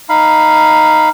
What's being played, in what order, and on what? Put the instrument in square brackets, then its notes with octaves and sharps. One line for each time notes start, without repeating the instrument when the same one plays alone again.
[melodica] D#4 F5 B5